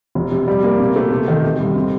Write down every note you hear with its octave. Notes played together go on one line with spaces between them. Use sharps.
F1
C3
G3
A#3
C3
A3
C3
D#3
C3
C2
C4